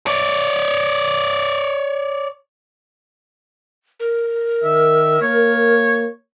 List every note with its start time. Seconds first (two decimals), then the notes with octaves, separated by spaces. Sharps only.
0.07 C#5 D5
4.00 A#4
4.63 D#3 E5
5.22 A#3 C#5